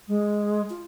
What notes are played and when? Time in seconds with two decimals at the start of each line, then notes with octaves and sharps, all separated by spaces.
0.08 G#3
0.70 F4